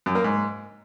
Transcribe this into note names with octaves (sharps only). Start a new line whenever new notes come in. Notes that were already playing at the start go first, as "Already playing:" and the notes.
F#2
A#3
G#2